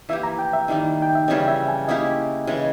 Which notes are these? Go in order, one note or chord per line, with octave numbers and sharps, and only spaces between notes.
E3 A#3 E4 G4 E5
A#5
G5
E5
D#3 G3 A#3 D#4
G5
E5
C#3 E3 G3 C#4 D#5
G5
E5
G#5
A#3 C#4 E4 G4 D#5
C#3 E3 G#3